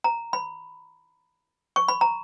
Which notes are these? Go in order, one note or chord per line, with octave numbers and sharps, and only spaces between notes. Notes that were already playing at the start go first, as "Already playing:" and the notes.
A#5
B5
C#6
B5
A#5